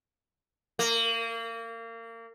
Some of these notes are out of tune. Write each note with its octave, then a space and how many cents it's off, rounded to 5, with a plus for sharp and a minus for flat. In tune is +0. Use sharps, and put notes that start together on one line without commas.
A#3 -30